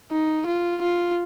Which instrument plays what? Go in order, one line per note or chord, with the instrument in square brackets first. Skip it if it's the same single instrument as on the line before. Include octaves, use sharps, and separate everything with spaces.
[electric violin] D#4
F4
F4